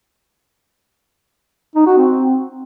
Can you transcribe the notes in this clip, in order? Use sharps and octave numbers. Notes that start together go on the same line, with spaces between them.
D#4
F#4
C4